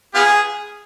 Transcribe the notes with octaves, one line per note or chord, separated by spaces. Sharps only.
B3 F4 G#4